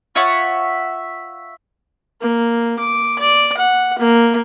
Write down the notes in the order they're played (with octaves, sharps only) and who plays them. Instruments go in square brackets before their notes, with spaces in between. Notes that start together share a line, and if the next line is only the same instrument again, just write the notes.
[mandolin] F4 C#5 E5 F#5
[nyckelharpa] A#3
D6
D5
F#5
A#3